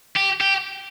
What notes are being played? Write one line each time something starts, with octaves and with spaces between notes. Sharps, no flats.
G4
G4